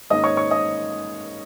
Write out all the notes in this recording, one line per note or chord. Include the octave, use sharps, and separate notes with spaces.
G#2 D#3 A#3 C#4 D#5 D#6
C#5 C#6
C#5 C#6
D#5 D#6